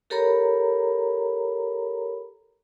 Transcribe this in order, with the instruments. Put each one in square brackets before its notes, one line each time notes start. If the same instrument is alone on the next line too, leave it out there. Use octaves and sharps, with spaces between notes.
[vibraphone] G4 A4 A#4 C#5 A#5 B5